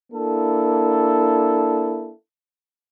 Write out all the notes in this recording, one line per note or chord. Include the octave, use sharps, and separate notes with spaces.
A#3 D4 E4 A4